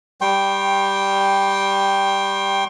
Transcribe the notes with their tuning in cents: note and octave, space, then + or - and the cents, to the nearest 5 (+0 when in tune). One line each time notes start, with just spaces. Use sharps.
G3 +0 G5 +0 C6 +35